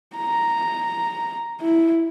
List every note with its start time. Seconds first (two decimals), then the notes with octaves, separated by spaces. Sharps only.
0.16 A#5
1.61 E4